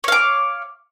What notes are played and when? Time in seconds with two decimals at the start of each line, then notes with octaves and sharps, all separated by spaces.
0.04 C#5
0.08 F5
0.12 D6